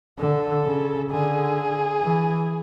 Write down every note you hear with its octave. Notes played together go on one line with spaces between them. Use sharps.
D3 A4
C#3
D3 G#4
E3